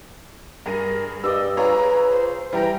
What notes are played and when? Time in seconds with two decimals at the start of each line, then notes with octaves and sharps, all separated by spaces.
0.66 G2 G#4 A#4 D#7
1.24 G2 D5 D#5 D6 E6
1.57 F4 G#4 B4 C#5 A#5
2.12 C5
2.53 E3 G3 G5 A#5 A#6